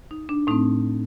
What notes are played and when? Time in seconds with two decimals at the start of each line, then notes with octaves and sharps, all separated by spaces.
0.11 D#4
0.29 D4
0.47 A2 A3 C4 D#4